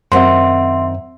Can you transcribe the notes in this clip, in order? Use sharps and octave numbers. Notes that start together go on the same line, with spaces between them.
F#2 D#3 C4 E5 F#5 C6